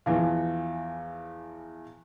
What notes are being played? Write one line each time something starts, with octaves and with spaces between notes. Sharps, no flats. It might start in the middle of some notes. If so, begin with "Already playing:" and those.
E2 E3 F3